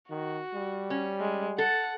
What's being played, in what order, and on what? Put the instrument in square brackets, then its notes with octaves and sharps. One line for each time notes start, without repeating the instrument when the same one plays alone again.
[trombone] D#3 [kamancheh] F#4
[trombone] G3
[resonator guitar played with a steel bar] C#4
[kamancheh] G#3
[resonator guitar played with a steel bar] A4 [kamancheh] F#5